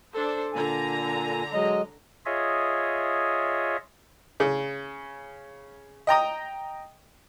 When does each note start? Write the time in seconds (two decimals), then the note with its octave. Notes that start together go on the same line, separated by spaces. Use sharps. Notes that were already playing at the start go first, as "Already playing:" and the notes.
0.12 D4 A4 C5
0.53 A#2 D3 G#5 A#5
1.53 F#3 G#3 D#5
2.26 F4 G#4 C#5 D#5 E5
4.40 C#3
6.07 D#5 G5 A#5 D#6